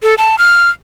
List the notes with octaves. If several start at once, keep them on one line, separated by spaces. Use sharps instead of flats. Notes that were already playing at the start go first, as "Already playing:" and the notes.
A4
A5
F6